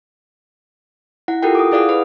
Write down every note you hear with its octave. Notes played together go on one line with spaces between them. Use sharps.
E4 F#5
F4 G4 A4 A#4 F#5 G5
D6 D#6
E4 G#4 D5 F5 F#5 D#6
B4 F#5